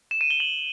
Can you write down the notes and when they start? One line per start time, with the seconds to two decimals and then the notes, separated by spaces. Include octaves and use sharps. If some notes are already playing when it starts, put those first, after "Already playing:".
0.11 E7
0.21 D#7
0.30 G7
0.40 F#7